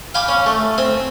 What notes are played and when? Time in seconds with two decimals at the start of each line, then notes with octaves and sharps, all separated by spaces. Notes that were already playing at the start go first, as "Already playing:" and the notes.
0.14 F5 G5 G#5 B5 D6
0.28 C#4
0.46 A3
0.78 C4 G#5